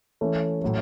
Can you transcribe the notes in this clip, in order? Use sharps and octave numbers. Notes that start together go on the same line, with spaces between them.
E3 A3 C#4
A2 F#3 A3